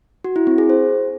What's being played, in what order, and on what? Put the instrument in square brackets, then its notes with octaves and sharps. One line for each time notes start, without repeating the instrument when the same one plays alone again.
[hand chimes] F#4
E4
C4
G#4
C5